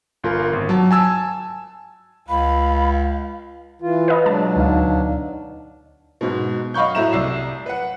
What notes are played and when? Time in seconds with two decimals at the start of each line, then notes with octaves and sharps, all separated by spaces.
0.24 G1 F4 A#4
0.53 G#1
0.69 F#3 A5
0.91 G#5 A5 E6
2.29 C#2 F5 B5
3.82 E3 F4
4.08 B4 D#5
4.26 B2 F#3 G#3 D4 A5
4.56 D2 D#4 F5
6.21 G#2 B2
6.74 D#5 F5 B5 C#6 G6
6.95 A2 F#4 E5 A#5 E7
7.13 C2 D5 E6 C7
7.66 B4 F#5